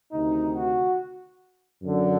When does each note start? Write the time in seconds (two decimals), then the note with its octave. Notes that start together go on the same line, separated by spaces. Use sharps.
0.12 D2 C3 D#3 D#4
0.54 F#4
1.82 F#2 D3